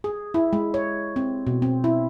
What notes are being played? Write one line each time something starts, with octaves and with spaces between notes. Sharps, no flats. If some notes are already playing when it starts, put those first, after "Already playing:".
G#4
E4
G#3
C#5
C4
B2
C4
E4